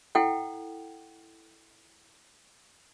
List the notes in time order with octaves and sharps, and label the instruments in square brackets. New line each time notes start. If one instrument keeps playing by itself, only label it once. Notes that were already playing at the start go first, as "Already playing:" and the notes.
[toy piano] E4 A4 F#5 G5